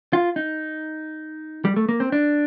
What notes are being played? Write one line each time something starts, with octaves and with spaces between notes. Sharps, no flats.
F4
D#4
G3
A3
A#3
C4
D4